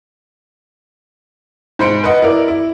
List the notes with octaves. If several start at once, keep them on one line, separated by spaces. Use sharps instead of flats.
G#2 C5 B5 C#7 D7
B4 D#5 F#5
E4 A#4 D5
E4